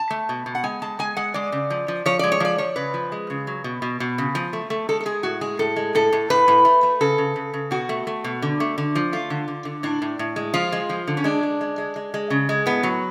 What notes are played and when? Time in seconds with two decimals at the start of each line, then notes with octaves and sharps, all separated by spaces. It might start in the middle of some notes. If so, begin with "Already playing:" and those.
Already playing: A5
0.10 A3
0.29 B2
0.46 B2
0.55 F#5
0.63 G#3 G#5
0.82 G#3 A5
0.99 G#3 G#5
1.17 G#3 F#5
1.34 G#3 D5
1.52 C#3
1.70 F3
1.88 F3
2.06 F3 C#5
2.19 G#3 D5
2.32 C#5
2.40 F3 D5
2.58 F3 C#5
2.76 C#3 B4
2.94 F3
3.12 G#3
3.30 C#3
3.47 F#3
3.64 B2
3.82 B2
4.00 B2
4.18 C#3
4.35 F3
4.53 A3
4.70 A3
4.89 G#3 A4
5.00 A4
5.05 G#3 G#4
5.23 A2 F#4
5.41 G#3 G#4
5.59 A2 A4
5.76 G#3
5.95 A2 A4
6.12 A2
6.30 A2 B4
6.48 A2
6.65 A3
6.83 A3
7.01 C#3 A4
7.18 C#3
7.36 C#3
7.53 C#3
7.71 B2 F#4
7.89 A3
8.07 A3
8.24 B2
8.42 D3
8.60 A3
8.78 D3
8.95 F3
9.13 A3 F4
9.30 D3
9.48 D3
9.65 D3
9.83 A2 D4
10.02 A2
10.19 A2
10.36 G#3
10.54 F3 F4
10.72 G#3
10.89 F3
11.07 D3
11.17 C#4
11.24 G#3 D4
11.43 G#3
11.61 G#3
11.78 G#3
11.96 G#3
12.14 G#3
12.30 C#3
12.49 G#3
12.66 A2 B3
12.83 F#3